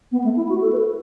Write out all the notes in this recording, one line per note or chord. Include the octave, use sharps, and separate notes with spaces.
B3
A3
E4
F#4
A4
B4
A4